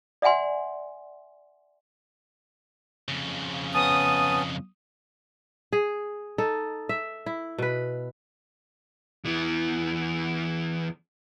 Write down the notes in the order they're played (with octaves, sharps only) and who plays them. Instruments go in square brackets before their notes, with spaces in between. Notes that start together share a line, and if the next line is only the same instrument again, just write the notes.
[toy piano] D5 E5 F#5 G#5 C6
[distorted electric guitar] F2 C#3
[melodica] B3 C#4 A5 [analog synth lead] D#6
[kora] G#4
D#4 A4
E5
E4
B2 B4
[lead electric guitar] E2 E3